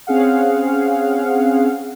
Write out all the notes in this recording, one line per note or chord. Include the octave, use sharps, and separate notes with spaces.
C4 C#4 G#4 F5 F#5